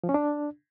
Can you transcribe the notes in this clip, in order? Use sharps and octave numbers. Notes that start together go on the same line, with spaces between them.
F3
C#4
D4